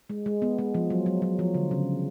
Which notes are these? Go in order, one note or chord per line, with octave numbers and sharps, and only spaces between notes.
G#3
G#3
B3
G#3
F3
F#3
F#3
F#3
F3
D3
C#3